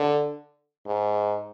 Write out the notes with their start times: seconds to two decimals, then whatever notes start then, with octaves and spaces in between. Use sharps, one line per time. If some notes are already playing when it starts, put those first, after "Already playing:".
Already playing: D3
0.87 G#2